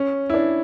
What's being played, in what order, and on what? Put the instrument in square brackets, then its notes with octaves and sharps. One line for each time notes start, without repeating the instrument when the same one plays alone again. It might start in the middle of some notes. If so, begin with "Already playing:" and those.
Already playing: [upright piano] C#4
E4
D4